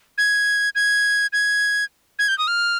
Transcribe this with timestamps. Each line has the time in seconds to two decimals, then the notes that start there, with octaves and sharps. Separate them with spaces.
0.18 G#6
0.75 G#6
1.33 G#6
2.19 G#6
2.28 G6
2.38 D#6
2.48 F6